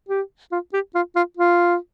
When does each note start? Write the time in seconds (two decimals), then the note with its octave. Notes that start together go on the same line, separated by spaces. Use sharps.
0.09 G4
0.52 F4
0.73 G4
0.95 F4
1.16 F4
1.37 F4